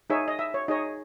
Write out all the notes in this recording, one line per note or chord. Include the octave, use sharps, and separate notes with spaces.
D#4 G#4 C#5 E5
D#5
E5
C#5
D#4 G#4 C#5 D#5